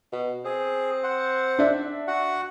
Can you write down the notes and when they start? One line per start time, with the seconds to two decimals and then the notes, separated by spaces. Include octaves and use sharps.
0.13 B2
0.45 C4 G#4
1.03 C5 F#5
1.58 D4 E5
2.08 F#4 F#5